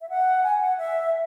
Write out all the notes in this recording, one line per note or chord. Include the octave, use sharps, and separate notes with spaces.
E5
F#5
G#5
F#5
E5